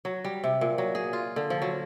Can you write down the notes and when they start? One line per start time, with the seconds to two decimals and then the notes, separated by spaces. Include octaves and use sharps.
0.05 F#3
0.25 G3
0.44 C3
0.61 A#2
0.78 F#3
0.95 G#4
1.13 F4
1.36 D3
1.50 F3
1.62 F#3